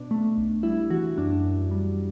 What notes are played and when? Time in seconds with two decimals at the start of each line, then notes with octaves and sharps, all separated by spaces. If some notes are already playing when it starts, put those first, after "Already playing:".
Already playing: B2 D4
0.11 A3
0.38 B1
0.63 G3 E4
0.90 E3 F#4
1.18 F#2 D4
1.43 F#2
1.71 G3